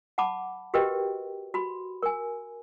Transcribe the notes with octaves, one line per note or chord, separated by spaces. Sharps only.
F#5 A5 B5 D6
F#4 G4 A#4 B4 D#5 G5
F#4 B5 C6
A#4 G#5